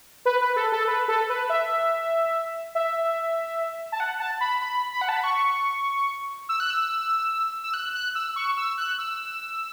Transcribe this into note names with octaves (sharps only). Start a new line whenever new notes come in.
B4
B4
A4
A4
B4
A4
B4
E5
E5
A5
F#5
A5
B5
B5
B5
F#5
A5
B5
C#6
E6
F#6
E6
E6
F#6
F#6
E6
C#6
E6
F#6
E6